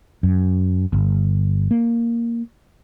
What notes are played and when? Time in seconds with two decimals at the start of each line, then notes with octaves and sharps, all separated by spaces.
0.23 F#2
0.93 G1
1.71 A#3